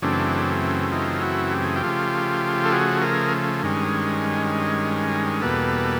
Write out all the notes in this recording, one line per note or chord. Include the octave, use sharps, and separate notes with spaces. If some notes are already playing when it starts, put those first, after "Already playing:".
F#2 C#3 E3 A3 C4 D4
D#4 F4
E4 F#4
G4
G#4
F4 G4
C#3 F3 A3
A4
F#4 G#4
G#4 A#4
G2 D#3 G#3 C#4
E2 B2 G3 A#3 A4 B4